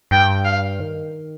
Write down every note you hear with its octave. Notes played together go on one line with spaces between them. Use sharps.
G2 G5
F5
D#3